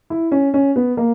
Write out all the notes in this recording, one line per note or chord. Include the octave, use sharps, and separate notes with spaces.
E4
C#4
C#4
B3
A#3